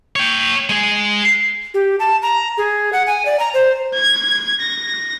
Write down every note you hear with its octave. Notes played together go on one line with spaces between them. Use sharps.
C#5 G5
G#3 G#4
G4
A5
A#5
G#4
F#5
G#5
D5
A#5
C5
G#6
A#6